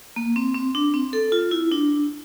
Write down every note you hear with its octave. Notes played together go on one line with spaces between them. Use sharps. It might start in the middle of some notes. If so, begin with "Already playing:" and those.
A#3
C4
C4
D4
C4
A4
F4
E4
D4